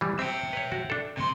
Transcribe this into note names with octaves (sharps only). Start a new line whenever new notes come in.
E3 G3
C4 E5 G5
B4 C#5
F#4
D4 A4
C3 C6